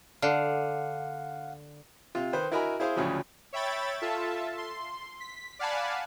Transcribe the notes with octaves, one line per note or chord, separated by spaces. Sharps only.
D3 F5 F#5
C3 F4
D#3 B4 C5
E4 F#4 A#4 D#5 G#5 B5
E4 G#4 C5 F5 C6
D2 A2 C#3 F3 F#3
C#5 E5 G5 B5 A6
F4 A4 E5 A5
C6
B6
D5 F5 F#5 G#5 A5 B5